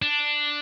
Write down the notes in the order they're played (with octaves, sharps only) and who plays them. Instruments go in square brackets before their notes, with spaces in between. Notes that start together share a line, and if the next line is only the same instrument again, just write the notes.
[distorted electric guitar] D4